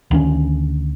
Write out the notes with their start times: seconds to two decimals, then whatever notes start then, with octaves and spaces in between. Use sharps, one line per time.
0.11 D2 D#3 C#4